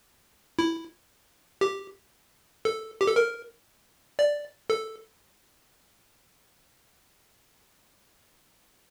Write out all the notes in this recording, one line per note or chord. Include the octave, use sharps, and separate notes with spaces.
E4
G4
A4
G4
A4
A#4
D5
A4